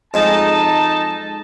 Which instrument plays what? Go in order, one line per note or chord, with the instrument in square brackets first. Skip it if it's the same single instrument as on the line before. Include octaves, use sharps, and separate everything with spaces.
[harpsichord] F2 G#3 [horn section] D#4 A5